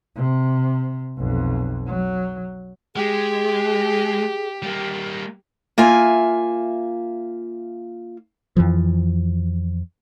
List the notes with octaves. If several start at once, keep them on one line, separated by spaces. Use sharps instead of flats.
C3
B1 F2
F#3
G#3 G4 G#4
G3 A#3
A#3 F4 E5 G#5
F2 E3 F3